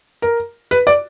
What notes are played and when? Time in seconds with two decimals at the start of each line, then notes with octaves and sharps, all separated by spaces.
0.22 A#4
0.71 B4
0.87 D5